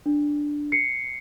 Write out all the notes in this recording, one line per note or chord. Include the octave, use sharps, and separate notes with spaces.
D4
C7 C#7